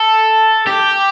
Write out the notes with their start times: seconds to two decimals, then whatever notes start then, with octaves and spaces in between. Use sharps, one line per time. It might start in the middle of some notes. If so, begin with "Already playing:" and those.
Already playing: A4
0.66 G4